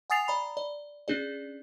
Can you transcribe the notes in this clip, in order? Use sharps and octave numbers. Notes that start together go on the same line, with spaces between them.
F#5 G#5 D#6 A6 C7 F7
D5 A#5 B5
D5
C#4 D4 G#4 D5